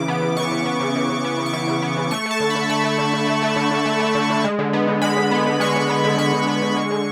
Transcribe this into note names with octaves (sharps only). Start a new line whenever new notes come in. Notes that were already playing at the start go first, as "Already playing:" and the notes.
Already playing: C#3 E3 D6
B3
C#3
E3 C#6
C#3
B3
C#3
E3
C#3
B3
C#3
C#6
E3 D6
C#3
B3
C#3
A3 C#6
A3 A5
D3
B5
D3
A3 B5
A3
D3
D3
A3
A3
D3
D3
A3
A3
D3
D3
G#3
D3
B3
D3
G#3 B5
D3
B3
D3
G#3 C#6
D3
B3
D3
G#3 C#6
D3
B3
D3
G#3
D3